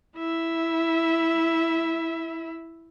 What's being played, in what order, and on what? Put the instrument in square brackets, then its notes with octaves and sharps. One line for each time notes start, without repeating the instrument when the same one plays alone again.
[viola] E4 E5